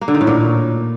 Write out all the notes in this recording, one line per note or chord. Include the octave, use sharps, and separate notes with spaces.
A#3
D3
D#3
A2
A#2